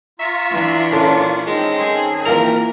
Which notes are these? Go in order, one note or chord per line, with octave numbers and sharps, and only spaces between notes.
F4 E5 A#5 C#6
E3 D4
A#2 C#4 F4 A4 C#6
D#3 G#3 C4
G#4
E3 A#3 F4 A#4 F7